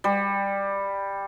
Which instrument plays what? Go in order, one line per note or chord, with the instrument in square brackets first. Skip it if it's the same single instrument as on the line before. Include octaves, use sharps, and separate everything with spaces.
[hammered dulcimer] G3